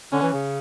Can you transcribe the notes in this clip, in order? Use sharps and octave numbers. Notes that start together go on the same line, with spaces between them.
D3 C#4
E3
C#3